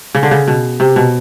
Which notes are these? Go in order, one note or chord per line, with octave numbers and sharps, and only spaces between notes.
C#3
D3
C#3
B2
C3
B2